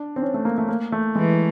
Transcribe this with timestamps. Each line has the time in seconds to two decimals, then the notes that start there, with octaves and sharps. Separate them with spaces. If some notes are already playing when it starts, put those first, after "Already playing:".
Already playing: D4
0.16 C4
0.22 C#4
0.34 A3
0.45 A#3
0.58 A3
0.69 A#3
0.92 A3
1.15 E3 G#3